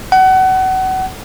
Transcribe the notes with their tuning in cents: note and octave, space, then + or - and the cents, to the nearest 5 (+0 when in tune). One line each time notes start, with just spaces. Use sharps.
F#5 +30